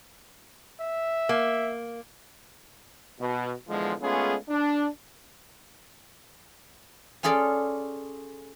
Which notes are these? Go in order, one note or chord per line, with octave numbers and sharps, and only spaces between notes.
E5
A#3
B2
E2 D3 F3 G#3
G#3 A3 B3 C#4 F4 G#4
D4
C#4 F4 G#4 A4 D5